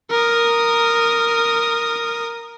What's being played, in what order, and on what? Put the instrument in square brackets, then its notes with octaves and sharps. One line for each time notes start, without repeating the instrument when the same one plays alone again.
[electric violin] A#4 D#6